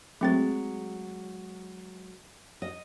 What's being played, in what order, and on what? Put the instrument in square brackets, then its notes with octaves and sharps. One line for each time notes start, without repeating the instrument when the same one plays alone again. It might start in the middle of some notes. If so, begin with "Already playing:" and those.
[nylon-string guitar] F#3 G#3 [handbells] A3 C4 A6
[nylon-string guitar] D#5